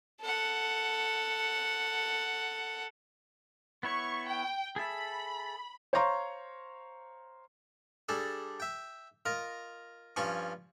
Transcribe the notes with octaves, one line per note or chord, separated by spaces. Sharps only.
A4 F#5
B3 E4 C#5 C#6
G5
G#4 A4 E5 B5
C5 C#5 F5 A#5 C6 C#6
G3 D4 G#4 A4
E5 G5
F4 A#4 D#5
G2 F3 C#4 G#5 C#6